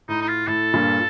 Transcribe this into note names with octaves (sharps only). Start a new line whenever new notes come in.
A2 D#4
D#4
F4
A2 A4
G2 A#2